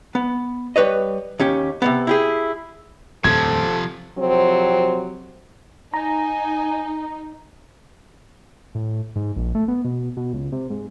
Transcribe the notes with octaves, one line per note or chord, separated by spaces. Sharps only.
B3
G3 B4 C#5 D#5
D#2 C#4 G4
C3 D#3 B3
E4 G4 G#4
D#1 F2 C3 F3 A4 G#6
F2 C3 F#3 C4
D#4 G#5 A#5
A2
G#2
A#1
A3
B3
B2
B2
C#2
C3
G#2